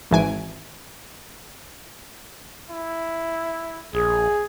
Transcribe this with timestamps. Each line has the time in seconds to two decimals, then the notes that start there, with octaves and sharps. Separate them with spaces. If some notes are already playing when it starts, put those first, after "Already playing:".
0.11 G#1 E3 G#5 D7
2.70 E4
3.93 A#1 G#4